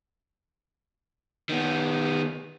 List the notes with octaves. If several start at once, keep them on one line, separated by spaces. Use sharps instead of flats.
D#3 B3